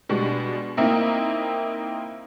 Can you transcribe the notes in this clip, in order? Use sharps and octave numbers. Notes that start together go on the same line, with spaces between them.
B2 G3 G#3 D4
A#3 C4 D#4 E4